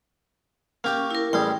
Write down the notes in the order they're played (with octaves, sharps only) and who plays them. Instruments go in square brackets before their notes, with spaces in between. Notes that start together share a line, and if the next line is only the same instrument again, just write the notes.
[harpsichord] A#3 G4 [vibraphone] C#4 C#6
[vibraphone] E4 A#4
[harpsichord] A1 G3 G#4 [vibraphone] G5